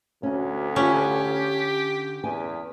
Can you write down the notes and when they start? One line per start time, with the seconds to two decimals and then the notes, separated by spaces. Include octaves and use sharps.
0.23 D2 C#4 F#4
0.76 D3 C#4 F4 G4
2.24 E2 G#5